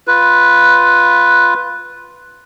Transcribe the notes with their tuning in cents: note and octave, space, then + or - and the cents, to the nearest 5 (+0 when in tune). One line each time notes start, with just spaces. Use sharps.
F4 +0 B4 +0